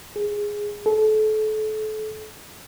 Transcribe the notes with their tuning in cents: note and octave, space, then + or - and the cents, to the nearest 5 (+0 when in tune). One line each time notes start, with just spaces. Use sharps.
G#4 -5
A4 -30